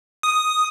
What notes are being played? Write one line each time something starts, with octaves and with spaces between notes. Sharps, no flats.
D#6